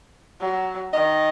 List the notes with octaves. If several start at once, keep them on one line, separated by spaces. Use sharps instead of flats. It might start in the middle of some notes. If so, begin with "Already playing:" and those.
F#3
D#3 D#5